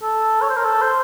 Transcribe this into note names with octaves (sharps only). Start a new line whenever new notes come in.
A4
C#5
C5
A#4
A4
C5